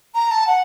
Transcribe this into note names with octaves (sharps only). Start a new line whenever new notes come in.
A#5
A5
F#5